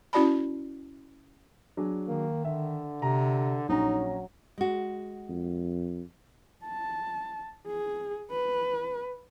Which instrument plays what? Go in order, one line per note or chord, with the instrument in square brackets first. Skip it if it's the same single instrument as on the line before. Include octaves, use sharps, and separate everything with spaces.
[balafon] C#4 E4 F#4 D5 A5 B5
[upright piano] F#3 D4 G#4
[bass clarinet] D#3 [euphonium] A#3
[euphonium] D3 [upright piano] E5
[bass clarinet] C3 [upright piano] A#5
[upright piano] A#1 C#4 A#5 [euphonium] F#3 [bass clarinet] D#4
[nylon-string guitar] G#3 F#4
[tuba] F2
[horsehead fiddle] A5
G#4
B4